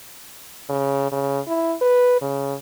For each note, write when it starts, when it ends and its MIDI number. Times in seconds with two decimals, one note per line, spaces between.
0.70 1.11 49
1.12 1.40 49
1.47 1.75 64
1.82 2.21 71
2.22 2.55 49